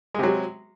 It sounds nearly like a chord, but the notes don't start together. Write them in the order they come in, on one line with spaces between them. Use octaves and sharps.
G#3 C3 F#3